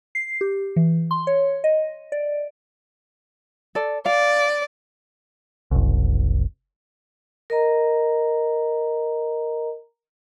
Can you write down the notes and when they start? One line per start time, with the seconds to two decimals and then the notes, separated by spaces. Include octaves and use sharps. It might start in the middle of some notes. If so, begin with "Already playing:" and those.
0.15 C7
0.41 G4
0.76 E3
1.11 C6
1.27 C#5
1.64 D#5
2.12 D5
3.75 A4 D5
4.06 D5 F5
5.71 F#1 C2
7.50 A#4 D#5 A#5